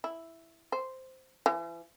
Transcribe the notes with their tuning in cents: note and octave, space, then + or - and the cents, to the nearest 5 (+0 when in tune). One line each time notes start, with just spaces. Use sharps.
E4 +0
C5 -5
E3 +35